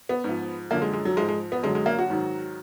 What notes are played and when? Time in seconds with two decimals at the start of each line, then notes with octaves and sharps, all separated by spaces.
0.09 B3
0.24 G#2
0.29 F3
0.71 F#2 D3 F3 A#3
0.82 G#3
0.93 G#3
1.05 F#3
1.16 G#2 F3 G#3
1.29 G#3
1.52 B3
1.63 F#2 D3 F#3 G#3
1.75 G#3
1.86 A#3
1.99 F#4
2.10 G#2 D#3 F#3